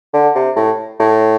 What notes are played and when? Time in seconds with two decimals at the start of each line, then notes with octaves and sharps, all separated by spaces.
0.14 D3
0.35 C3
0.56 A2
1.00 A2